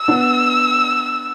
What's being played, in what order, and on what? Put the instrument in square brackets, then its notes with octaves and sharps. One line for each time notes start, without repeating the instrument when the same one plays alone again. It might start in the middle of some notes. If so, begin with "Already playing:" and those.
Already playing: [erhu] E6
[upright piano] B3 D4